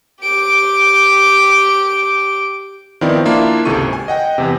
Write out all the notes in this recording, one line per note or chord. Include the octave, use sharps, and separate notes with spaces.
G4 D7
D#3 F3 B3 C4 E4 D5
A#3 D4 E4 F4
G#1 C#2 C3 A4 C#6 D#7
G#5
D#5 F#5 G5
E2 C3